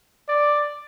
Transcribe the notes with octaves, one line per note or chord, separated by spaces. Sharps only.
D5